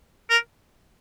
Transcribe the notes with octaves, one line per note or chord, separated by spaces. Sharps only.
A#4